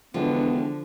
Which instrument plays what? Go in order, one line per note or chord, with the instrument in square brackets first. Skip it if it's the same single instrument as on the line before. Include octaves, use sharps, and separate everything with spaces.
[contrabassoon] E1 [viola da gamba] D3 [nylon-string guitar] F3 [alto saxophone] B3